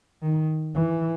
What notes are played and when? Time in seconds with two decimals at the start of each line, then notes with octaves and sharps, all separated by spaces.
0.23 D#3
0.75 E3